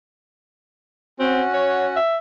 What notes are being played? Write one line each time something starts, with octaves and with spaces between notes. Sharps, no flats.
C4 C#4 F#4 F#5
C#5
E5